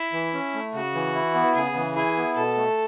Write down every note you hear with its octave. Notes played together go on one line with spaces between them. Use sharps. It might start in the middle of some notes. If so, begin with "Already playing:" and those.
Already playing: E4
E3
C#4
A3
C#3 F#4
E3
E4
B3
C#3 G#4
E3
E4 G#4
B3
B2 A4
A3